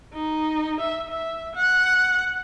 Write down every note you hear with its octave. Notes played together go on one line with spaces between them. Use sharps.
D#4
E5
E5
F#5